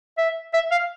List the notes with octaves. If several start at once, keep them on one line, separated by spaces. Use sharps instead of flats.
E5
E5
F5